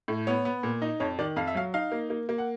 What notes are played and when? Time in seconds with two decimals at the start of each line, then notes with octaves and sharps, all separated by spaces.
0.08 A2
0.27 B3 C#5
0.45 B3
0.63 A#2
0.82 D#4
1.00 F2 C#5
1.19 D#3 D5
1.36 F2 F5
1.47 E5
1.55 F#3 F5
1.74 D#4 F5
1.92 A#3
2.10 A#3
2.29 A#3
2.38 F#5